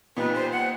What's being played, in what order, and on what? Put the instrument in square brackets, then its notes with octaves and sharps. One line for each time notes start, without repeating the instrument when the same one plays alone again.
[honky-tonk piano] A#2 G3 B3 D#4 G4 [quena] B4
[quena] C5
F#5